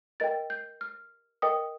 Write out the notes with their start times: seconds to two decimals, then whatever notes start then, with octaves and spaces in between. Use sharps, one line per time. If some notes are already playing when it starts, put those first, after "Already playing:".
0.20 A#4 D#5 G5 A6
0.50 G6
0.81 F6
1.42 A#4 D#5 G5 D#6